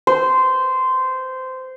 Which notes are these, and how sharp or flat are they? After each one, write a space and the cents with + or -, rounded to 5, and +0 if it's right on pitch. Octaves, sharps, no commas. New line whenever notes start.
C5 -15